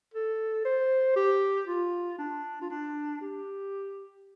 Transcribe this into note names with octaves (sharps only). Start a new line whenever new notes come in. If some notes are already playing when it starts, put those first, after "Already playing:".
A4
C5
G4
F4
D4
F4
D4
G4